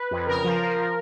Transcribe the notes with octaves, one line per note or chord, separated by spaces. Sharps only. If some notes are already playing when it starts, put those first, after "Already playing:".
Already playing: B4
F2
C#3 A#4
F3
F3